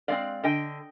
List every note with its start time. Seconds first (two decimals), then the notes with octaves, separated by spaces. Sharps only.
0.08 G#3 C4 D5 F5
0.44 D3 D#5 G5